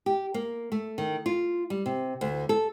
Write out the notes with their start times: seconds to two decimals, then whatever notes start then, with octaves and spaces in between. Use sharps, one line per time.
0.06 G4
0.34 A#3
0.72 A3
0.98 D#3
1.26 F4
1.70 G3
1.86 C3
2.21 D2
2.49 A4